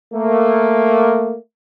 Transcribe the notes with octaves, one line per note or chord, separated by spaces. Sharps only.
A3 A#3